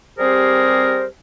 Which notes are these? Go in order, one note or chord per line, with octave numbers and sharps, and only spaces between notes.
G3 C4 G4 G#4 A#4 C5